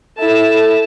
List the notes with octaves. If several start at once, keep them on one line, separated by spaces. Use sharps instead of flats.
E4 A4 A5